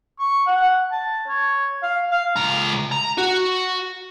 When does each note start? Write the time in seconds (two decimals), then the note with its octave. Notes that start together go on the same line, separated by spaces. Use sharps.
0.19 C#6
0.47 F#5
0.91 A5
1.28 C#5
1.83 F5
2.11 F5
2.36 C#2 A#5
2.92 A#5
3.18 F#4